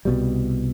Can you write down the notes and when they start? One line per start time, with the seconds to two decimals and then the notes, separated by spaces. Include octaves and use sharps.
0.05 C2 B2 G3